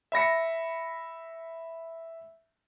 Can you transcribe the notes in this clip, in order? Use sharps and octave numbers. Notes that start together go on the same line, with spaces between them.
E5 B5 A#6 C#7